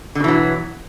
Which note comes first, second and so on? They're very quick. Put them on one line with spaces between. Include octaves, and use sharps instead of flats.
D3 B2 E3 F#3